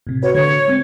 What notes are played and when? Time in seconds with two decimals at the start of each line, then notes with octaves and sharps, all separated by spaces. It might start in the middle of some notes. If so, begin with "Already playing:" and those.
0.07 A2 C3
0.23 F#4 B4 C#5
0.34 D3 A3 C#5
0.68 G#3 C4